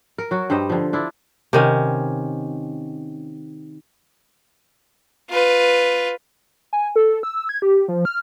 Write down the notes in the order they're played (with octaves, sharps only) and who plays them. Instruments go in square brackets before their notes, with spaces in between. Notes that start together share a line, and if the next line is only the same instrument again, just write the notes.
[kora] A#4
F#3 F#4
G2 G3 C5 D#5
D3 F3
D4 E4 F4
C3 D#3 C#4
[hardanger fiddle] F4 B4
[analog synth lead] G#5
A4
E6
G#6
G4
F3
F6